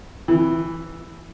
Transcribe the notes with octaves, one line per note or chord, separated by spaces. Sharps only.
E3